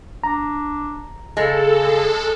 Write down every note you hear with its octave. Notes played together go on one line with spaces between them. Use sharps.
D4 A#5
C#3 G#3 A4